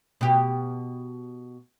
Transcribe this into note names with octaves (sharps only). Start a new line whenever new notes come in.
B2 G4